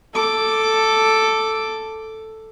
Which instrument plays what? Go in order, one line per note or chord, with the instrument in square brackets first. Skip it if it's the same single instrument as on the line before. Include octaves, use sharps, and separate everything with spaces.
[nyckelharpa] A4 D6